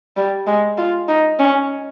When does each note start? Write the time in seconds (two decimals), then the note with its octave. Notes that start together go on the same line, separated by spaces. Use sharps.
0.17 G3
0.47 G#3
0.77 F4
1.08 D#4
1.39 C#4